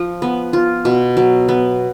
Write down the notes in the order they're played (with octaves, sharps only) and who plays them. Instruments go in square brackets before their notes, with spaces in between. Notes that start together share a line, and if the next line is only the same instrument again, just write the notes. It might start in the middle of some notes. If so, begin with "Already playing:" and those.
Already playing: [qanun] F3
B3
F4
B2
F#3
B3